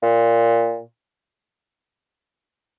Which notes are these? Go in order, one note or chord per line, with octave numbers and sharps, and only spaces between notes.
A#2